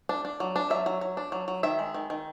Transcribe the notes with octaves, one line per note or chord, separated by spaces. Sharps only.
D4
D4
F#3
D4
F#3 E5
F#3
F#3
D4
F#3
F#3
D#3 E5
G#3
D#3
D#3